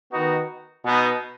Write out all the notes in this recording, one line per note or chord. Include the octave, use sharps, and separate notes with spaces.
D#3 B3 D#4 F#4
B2 B3 D#4